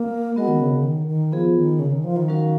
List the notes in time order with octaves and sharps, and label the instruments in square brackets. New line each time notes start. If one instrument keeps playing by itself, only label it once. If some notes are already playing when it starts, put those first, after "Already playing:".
Already playing: [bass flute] A#3
[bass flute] G#3 [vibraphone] B3 F#4 A#4 D#5 F#5
[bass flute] D#3
C#3
C#3
D#3
D#3
[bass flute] F3 [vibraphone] B3 F4 G#4
[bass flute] D#3
C#3
D#3
F3
D#3
[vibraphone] F#3 C#4 F#4 A#4 F5